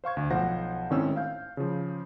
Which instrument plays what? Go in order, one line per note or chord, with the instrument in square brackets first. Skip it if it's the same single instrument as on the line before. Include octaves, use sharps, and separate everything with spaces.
[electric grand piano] C5 F5 C#6 G#6
D2
B1 F3 C5 F#5 A#6
G#1 A2 D#3 C4 C#4 E6
F5 G6
C#3 F3